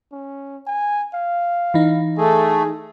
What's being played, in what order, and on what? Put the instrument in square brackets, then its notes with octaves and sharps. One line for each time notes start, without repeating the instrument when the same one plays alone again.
[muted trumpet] C#4
G#5
F5
[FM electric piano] E3 D#4
[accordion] A3 [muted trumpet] G#4